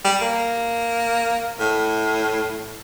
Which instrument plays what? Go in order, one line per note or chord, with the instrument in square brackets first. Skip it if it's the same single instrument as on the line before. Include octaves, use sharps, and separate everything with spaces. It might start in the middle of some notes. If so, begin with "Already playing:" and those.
[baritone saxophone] G3
A#3
A2